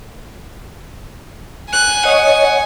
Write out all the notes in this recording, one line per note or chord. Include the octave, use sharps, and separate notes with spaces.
G#5 F#6
C#5 D#5 F#5